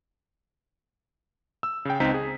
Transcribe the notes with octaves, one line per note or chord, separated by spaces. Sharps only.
E6
C#3 G5
C#2 C4 D#4 A#5 B6
G#4